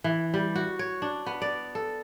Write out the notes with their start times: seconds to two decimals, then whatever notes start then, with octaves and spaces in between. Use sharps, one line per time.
0.04 E3
0.34 G3
0.56 F#4
0.79 C#5
1.02 D4
1.26 B3
1.42 D5
1.75 A4